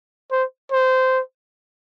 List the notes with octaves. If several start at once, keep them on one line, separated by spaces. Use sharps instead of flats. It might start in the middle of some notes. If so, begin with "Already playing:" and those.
C5
C5